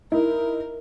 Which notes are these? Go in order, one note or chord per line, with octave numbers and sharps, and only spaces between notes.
D#4 E4 A#4